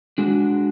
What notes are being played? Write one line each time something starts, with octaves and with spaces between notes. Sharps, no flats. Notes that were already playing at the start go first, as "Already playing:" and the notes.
G#3 D4 F#4